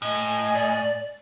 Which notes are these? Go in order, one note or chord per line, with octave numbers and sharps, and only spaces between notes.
A2 D#5 G#5
D5